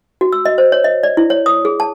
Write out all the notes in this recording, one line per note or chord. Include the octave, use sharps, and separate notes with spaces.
F#4
E6
D#5
C5
C#5
D#5
D5
E4
C#5
D#6
G#4
A5